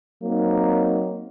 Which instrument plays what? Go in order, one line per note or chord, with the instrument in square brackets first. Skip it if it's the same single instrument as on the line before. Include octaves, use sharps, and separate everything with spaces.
[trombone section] F#3 A#3 C4 D#4